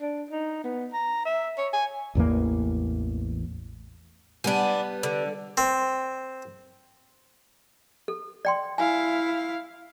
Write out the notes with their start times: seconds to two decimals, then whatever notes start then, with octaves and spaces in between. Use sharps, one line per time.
0.01 D4
0.30 D#4
0.64 B3
0.93 A#5
1.25 E5
1.58 C#5
1.73 G#5
2.15 A1 E2 E3 A#3
4.44 G3 B3 D4 B4 G#5
5.03 D3
5.57 C4
8.08 A4
8.45 D5 G5 C6
8.78 E4 F5 G#5